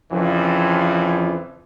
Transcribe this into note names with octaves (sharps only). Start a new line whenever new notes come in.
F2 C#3 E3 F3